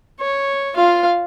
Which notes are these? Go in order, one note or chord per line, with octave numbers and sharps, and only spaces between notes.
C#5
F4 F5